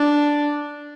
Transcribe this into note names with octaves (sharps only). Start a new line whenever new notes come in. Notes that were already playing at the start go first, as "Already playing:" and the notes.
Already playing: D4